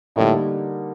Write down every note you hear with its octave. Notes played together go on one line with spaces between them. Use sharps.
A2 D3 G3 A#3 D#4